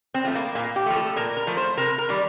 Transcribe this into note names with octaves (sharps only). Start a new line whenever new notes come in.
C4
F3 A3
A#3
A#2 A#3
G4
F3 A3
A4
A#2 A#4
A#4
F3 A3
C5
C3 A#4
A#4
D#3 G3